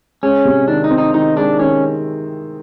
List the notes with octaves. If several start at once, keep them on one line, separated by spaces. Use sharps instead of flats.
G#3 C#4
C3
D#3 D4
D#4
C4
D#4
D#3 D#4
G#3 D4
D#3 C#4